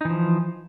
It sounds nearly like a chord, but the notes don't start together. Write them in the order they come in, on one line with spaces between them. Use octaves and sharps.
D#4 E3 F3